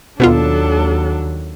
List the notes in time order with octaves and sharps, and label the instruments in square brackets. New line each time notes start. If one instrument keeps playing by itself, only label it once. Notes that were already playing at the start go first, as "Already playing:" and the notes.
[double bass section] D#2 F#3 [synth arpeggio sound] B2 B3 F4 [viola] D4 A4